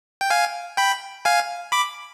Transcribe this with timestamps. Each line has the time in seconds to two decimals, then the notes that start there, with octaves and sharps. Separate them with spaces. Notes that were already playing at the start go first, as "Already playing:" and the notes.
0.21 G5
0.30 F5 G#5
0.77 G5 B5
1.25 F5 G#5
1.72 B5 D6